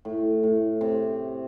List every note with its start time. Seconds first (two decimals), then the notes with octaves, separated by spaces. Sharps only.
0.05 A2
0.43 A2
0.81 C3